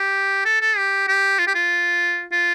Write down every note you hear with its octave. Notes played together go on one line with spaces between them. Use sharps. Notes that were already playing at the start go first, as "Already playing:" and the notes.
Already playing: G4
A4
A4
G4
G4
F4
G4
F4
F4